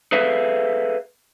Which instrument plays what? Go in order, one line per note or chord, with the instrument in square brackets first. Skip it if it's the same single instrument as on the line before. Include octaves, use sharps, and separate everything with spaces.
[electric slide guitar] G#4 A4 B4 E5 F5